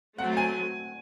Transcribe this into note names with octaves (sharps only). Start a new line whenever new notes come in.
F#3 A3 C4 F#5
G#5